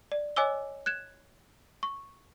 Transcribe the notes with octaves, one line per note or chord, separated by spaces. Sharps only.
D5
C#5 D#5 G#5 D6 E6 G7
F#6 G#6 E7
C#6